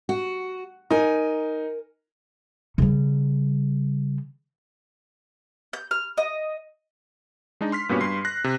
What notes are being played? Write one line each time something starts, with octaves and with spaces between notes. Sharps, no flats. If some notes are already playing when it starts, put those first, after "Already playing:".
F#4
D#4 A#4 G#5
C#3 G3
G6
F6
D#5
G#3 D4 D#4
C6 F6 B6
G2 A#2 B3 C#4 F#4 G4
G2 C6 C7
F#6 A#6
C3